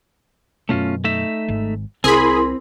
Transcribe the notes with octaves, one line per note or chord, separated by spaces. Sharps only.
F#2 B2 A3 C#4 F4
A3 D#4 E5
G#1 G#2
C2 C3 C4 E4 G#4 A#4 B5 C6